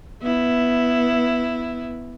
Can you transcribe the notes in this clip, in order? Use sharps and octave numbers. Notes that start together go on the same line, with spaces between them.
B3 E4